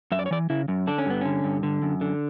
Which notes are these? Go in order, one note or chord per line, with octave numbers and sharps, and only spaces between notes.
F#2 E5
D5
C#5
E3 D5
C#3 E4
F#2
D3 D4
C#4
G2 B3
D3 C#4
G2
D3
F#2
D3